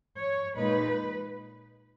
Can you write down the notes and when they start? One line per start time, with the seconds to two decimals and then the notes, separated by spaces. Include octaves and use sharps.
0.19 C#5
0.56 A#2 G#3 D#4 B4